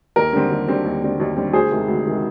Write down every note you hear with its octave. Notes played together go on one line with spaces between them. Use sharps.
D#2 A#4
D3 G3 C4
D#2
D3 G3 C4
D#2
D3 G3 C4
D#2
D3 G3 C4
D2 G#4 C5
C3 D#3 G#3
D2
C3 D#3 G#3